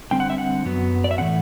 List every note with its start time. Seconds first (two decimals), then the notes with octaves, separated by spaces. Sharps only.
0.11 D3 G3 C4 G5
0.20 F#5
0.30 E5
0.38 F#5
0.65 F#2 F#3 B3
1.04 D5
1.11 E5
1.18 A2 E3 A3 C4 F#5